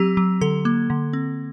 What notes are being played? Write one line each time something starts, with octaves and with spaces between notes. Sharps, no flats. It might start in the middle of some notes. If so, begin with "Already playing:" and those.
Already playing: F#3 C4 G4
F#3
D3 A4
A#3
D3
C4